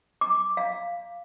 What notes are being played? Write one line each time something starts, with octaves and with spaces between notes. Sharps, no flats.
D6
F5